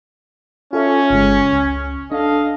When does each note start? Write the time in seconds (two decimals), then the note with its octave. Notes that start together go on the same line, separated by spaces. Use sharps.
0.73 C#4 F4 A4 E5
1.10 G1 C#3 G#3
1.53 C#2
2.12 D4 A4 D#5 F5